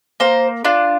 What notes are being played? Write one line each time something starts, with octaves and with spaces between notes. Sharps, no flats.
A#3 C5
D4 F4